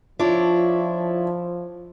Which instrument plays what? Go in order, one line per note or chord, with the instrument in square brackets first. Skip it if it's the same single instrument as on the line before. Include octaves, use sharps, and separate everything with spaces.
[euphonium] F3 [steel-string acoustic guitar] D4 E4 C#5 [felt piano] F4